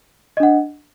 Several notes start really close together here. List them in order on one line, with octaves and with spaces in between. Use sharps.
D#5 D4 F#5